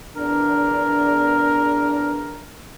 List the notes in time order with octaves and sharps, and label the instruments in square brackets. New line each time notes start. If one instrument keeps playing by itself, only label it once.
[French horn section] E2 D4 [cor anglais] A#4